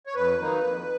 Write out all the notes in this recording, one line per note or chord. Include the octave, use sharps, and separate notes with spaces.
C#5
F2 B4
D#3 F#3 A#3 D#4
F2